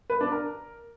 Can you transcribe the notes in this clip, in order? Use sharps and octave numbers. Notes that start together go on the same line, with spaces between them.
B4
D4
A#4